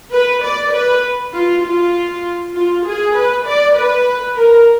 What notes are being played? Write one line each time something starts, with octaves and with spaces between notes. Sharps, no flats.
B4
D5
B4
F4
F4
F4
G#4
B4
D5
B4
A#4